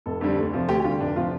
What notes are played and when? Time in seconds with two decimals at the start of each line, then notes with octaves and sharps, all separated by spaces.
0.06 F1 A4
0.21 F2 D3 G3
0.37 D2
0.53 C3 F3
0.68 D2 G4
0.80 G4
0.84 D3 G3 F4
1.00 F1 D4
1.16 C3 F3 F4